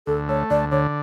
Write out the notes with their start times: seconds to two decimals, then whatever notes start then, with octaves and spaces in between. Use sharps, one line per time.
0.07 D2 A4
0.29 A3 C#5
0.50 D2 D5
0.71 D3 C#5